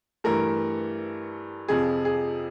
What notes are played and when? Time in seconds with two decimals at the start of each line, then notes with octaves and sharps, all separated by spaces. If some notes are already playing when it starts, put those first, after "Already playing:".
0.24 G2 E3 A3 A#4
1.68 F2 C3 F3 G#4
2.05 G#4